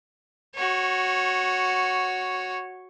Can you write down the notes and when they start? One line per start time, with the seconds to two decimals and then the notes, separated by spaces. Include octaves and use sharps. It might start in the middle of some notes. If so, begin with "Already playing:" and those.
0.56 F#4 C#5